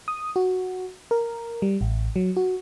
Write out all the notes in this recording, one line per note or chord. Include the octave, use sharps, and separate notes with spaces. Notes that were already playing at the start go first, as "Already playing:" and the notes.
D#6
F#4
A#4
G3
A1
F#3
F#4